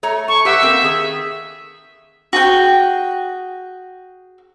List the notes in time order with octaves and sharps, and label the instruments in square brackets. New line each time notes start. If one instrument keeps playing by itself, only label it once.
[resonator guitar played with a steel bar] A3 C#5 A#5
[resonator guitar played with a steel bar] A5 [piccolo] C#6
[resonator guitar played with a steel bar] G4 B4 F#5 [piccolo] E5
[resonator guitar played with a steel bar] A3 A#3 C4
D#3 G#4
[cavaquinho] F#4 G#4 G5